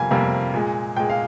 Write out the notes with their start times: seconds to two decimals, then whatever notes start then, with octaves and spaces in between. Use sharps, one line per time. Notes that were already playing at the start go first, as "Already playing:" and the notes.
Already playing: F2 C3 G3 A#3 G#5
0.11 F2 C3 G3 A#3
0.54 A#2 G#3
0.97 A#2 G#3 G5
1.10 F5